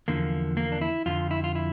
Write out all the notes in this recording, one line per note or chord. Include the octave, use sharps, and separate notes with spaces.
E2 D3 F3 A#3
A#3
D4
E4
F2 D3 F3 F4
E4
F4
E4